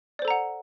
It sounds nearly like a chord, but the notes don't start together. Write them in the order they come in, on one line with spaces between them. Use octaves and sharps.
D5 C5 A4 A#5 F#5